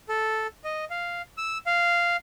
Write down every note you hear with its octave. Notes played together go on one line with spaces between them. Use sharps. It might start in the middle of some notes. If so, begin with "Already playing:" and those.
A4
D#5
F5
E6
F5